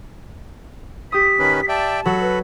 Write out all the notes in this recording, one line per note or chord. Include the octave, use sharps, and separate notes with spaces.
G4 D#6 B6
D#3 C#4 B4
D5 E5 G5 A5
F#3 F#4 A4 B5
B4